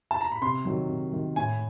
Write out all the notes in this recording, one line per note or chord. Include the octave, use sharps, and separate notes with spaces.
A5
A#5
B5
C3 C6
D#3 F#3
C3
D#3 F#3
A2 G#5